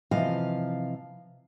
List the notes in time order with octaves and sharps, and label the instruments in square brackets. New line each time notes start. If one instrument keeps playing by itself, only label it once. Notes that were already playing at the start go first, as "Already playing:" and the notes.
[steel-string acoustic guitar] C3 E3 F3 D#5 F5